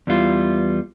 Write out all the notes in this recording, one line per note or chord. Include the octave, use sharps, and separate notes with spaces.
E2 E3 G3 F4